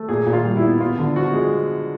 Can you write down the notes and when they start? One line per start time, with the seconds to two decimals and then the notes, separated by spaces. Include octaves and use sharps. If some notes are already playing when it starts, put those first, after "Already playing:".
Already playing: A3
0.09 A#2 G#4
0.27 A#2
0.33 F4
0.45 G3
0.57 E4
0.62 B3
0.80 B3 F4
0.99 D3
1.16 F3 F#4
1.33 G#3